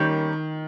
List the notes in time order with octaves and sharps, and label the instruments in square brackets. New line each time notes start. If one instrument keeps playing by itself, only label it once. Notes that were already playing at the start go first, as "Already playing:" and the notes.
Already playing: [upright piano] D#3 [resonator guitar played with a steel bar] G3 A#3 C#4 G4